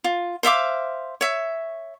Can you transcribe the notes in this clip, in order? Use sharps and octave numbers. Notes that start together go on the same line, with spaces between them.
F4
C5 E5 F5 D6
C#5 E5